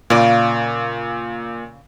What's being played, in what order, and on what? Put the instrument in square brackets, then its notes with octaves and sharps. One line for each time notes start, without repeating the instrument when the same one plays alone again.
[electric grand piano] A#2 [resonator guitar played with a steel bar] C#3 F4 D5